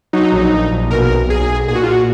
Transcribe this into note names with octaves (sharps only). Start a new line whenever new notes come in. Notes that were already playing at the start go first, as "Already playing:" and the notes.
F#3 D#4
A#1
A#1
A#1
B2 A#4
B1
B1 G#4
B1
A#2 G#4
F#4
F4
A#2 F#4